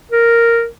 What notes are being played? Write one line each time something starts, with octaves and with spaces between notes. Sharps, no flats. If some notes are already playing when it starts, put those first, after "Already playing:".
A#4